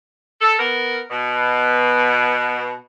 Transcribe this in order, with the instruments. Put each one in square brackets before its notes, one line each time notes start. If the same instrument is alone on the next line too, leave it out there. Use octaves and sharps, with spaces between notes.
[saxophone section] A4
B3 A#4
B2